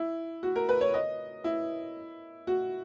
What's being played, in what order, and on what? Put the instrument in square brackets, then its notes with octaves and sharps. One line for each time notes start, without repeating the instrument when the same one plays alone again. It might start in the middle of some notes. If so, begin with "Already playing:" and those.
Already playing: [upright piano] E4
F#4
A#4
B4
C#5
D#5
E4
F#4